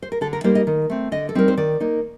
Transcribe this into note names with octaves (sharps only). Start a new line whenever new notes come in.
C5
A#4
D3 A4
A#4
G3 A#3 D#4 C5
D#5
D#3
A3 C4
D3 D#5
A4
G3 C4 D#4 A#4
C5
D#3 D5
A#3 D#4